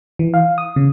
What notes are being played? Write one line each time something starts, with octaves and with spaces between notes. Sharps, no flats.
E3
F5
D#6
C#3